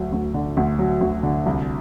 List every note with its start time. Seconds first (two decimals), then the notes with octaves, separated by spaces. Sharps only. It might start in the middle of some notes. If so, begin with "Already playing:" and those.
Already playing: D2 F#3
0.12 D2
0.34 D3
0.57 D2
0.79 F#3
1.01 D2
1.23 D3
1.46 C2